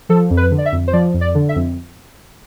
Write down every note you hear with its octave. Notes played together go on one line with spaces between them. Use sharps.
F3 A4
F2
B4
D3
D5
E5
F2
C5
F3 D5
F2
D5
D3
E5
F2